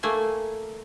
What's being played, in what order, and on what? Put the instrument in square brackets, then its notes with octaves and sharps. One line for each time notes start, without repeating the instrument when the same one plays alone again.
[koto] A3 A#3 G#5